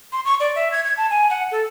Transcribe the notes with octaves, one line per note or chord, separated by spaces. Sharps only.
C6
C#6
D5
E5
G#6
G#6
A5
G#5
F#5
A4